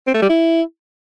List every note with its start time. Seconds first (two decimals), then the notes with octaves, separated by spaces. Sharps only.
0.07 C4
0.15 A3
0.22 G3
0.29 E4